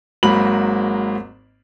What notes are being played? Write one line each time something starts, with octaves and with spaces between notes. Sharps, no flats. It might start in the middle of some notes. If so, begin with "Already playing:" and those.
G#1 G#2 F#3 A#3 B5 F#7